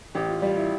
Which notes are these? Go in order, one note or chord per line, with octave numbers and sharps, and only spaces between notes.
A1 G4
F4
G3 F4
E4